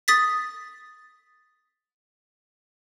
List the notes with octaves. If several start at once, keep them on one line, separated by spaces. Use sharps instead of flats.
D#6 A6 B6